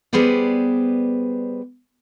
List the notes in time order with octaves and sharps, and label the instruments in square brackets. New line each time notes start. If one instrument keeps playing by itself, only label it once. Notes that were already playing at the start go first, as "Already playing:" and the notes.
[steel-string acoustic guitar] G3 B3 G#4 B4 C5 D5